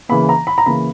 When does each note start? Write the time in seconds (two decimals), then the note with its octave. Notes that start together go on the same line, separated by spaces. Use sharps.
0.09 C#3 E3 A#3 B5
0.29 A#5
0.47 B5
0.58 A#5
0.66 C#3 E3 A#3 B5